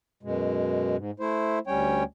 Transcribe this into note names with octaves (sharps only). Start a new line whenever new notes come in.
F#2 B2 G#3
G#2
A3 E4 C5
D2 G3 C#4 C#5 G5